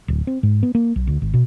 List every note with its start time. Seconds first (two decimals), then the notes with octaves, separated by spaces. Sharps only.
0.08 D1
0.27 C4
0.43 G#2
0.63 B3
0.75 A#3
0.96 B1
1.07 D2
1.22 G#1
1.34 B2